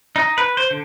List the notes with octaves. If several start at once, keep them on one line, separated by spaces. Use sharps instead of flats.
D#4
B4
C5
D3